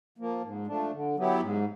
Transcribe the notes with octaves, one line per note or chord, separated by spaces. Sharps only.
F3 A#3
G#2
F3 A3 D4
D3
F#3 B3 E4 G4
G#2